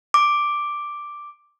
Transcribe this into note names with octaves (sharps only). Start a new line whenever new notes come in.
D6